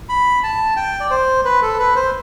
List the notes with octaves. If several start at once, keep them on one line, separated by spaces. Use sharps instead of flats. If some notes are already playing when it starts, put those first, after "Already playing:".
B5
A5
G5
D5
C5
B4
A4
B4
C5